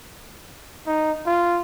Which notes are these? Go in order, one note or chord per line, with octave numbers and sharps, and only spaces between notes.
D#4
F4